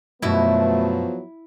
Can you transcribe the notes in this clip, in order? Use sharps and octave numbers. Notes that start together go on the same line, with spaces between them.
F#2 B2 F3 F#3 A3 B3 E4